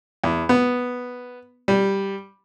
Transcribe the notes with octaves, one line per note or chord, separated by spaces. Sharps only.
E2
B3
G3